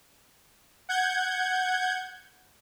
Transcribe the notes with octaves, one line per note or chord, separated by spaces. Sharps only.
F#5 G6 G#6